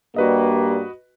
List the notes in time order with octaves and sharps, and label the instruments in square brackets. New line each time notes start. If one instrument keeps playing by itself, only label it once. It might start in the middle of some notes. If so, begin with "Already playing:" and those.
[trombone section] G2 G3 A#3 [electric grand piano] F#4 B4 D#5